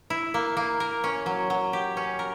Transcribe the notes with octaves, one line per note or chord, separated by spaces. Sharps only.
E4
A#3
A#3
A#4
C#4
F#3
F#3
G4
C#4
A#4